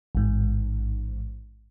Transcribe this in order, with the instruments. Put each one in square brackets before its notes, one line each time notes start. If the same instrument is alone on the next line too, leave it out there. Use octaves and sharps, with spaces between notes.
[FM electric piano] A1 G#2